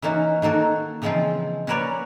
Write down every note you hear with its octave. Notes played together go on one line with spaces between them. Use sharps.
E3 A#3 C#4 D#4 F#4
D#3 A#3 F#4 A4
C#3 E3 F3 G#3 C4 F4
C#4 F#4 A#4 B4 C#5 D5